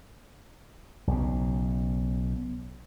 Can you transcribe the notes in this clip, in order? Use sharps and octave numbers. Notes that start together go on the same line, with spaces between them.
B1 C#3